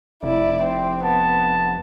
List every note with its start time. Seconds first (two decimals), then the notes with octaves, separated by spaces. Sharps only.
0.23 F1 E4 D5
0.62 C4
1.03 B3 A5